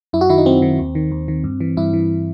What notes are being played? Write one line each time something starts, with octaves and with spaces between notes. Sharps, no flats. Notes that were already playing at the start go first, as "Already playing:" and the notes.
F#2 E4
F#4
D#3 E4
D#4
F#2 C4
D#3
D#2
D#3
D#2
D#3
G2
E3
G2 E4
E3